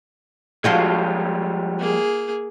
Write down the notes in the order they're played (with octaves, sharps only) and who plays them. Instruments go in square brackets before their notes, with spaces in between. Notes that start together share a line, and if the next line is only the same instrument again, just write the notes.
[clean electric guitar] F3 G3 G#3 [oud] F4 F#4 A4
[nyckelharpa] A#3 G#4